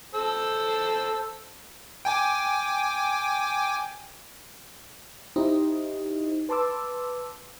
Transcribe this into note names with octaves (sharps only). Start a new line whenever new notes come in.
A4 C5 E6
G5 G#5 D6
D#4 E4 G4 C5 D#5
B4 A5 C6 D6 E6